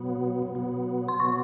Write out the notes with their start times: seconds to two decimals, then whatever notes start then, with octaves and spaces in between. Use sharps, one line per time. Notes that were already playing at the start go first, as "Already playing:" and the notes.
Already playing: B2 F#3 B3
0.55 B2 F#3 B3
1.08 C6
1.20 B2 F#3 B3 C#6